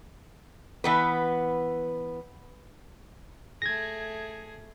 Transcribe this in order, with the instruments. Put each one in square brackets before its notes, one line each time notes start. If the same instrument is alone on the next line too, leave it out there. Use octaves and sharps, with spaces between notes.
[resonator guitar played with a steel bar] E3 B3 B4
[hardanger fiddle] A3 G#4 [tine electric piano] G#6 A#6